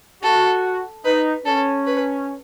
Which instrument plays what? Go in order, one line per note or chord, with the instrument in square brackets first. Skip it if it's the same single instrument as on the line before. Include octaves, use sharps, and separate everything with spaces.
[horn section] F#4 [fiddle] A4
[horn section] D#4 [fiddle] B4
[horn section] C#4 [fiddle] A4
[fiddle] B4